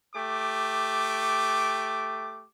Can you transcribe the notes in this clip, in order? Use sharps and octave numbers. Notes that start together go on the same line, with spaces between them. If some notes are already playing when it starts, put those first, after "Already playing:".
A3 G4 D6